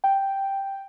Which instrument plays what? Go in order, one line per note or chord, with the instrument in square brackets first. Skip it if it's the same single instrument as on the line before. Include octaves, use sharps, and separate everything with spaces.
[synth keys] G5